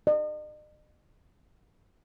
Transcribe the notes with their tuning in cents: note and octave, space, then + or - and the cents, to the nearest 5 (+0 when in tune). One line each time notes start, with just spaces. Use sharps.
D#5 -45